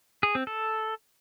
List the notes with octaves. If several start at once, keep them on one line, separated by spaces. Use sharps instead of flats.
G#4
C4
A4